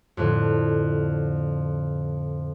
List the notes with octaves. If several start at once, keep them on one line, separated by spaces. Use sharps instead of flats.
F2 A2 D3